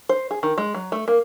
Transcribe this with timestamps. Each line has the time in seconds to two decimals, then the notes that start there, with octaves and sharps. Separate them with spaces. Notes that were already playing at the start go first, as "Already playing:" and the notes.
0.09 C5
0.31 G#4
0.43 D#3
0.58 G#3
0.74 F#3
0.92 A3
1.08 A#3